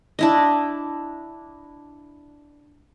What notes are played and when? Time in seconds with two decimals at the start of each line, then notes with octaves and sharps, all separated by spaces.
0.19 D4 E4 D#5